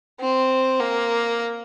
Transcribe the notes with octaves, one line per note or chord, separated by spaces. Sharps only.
C4
A#3